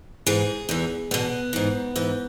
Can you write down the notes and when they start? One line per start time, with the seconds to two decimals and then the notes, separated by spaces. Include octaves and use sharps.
0.26 G#2 E3 G#4
0.69 E2 E3
1.11 E2 B2 B3
1.53 G#2 E3
1.96 G#2 E3